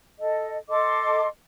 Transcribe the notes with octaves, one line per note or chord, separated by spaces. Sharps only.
A4 D#5
A4 D#5 C6 D6